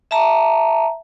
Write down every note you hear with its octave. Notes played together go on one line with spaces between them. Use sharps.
E5 A5 A#5